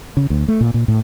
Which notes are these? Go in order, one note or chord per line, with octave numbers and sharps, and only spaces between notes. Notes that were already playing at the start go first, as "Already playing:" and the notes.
C#3
D2
A3
A#2
A#2
A2